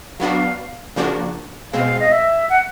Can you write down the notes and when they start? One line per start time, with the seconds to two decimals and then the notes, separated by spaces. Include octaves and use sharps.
0.19 F#3 B3 D4 F#4 F5
0.96 C#3 F3 A#3 D4 F#4
1.73 B2 G#3 C4 F5
2.00 D#5
2.11 E5
2.49 F#5